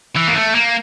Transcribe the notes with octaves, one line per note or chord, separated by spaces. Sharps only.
E3
A#3
A3
A#3